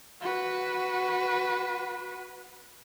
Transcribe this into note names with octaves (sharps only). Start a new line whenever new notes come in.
F#4 B4